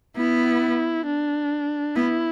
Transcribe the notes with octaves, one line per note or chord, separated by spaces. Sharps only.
B3 E4
D4
B3 E4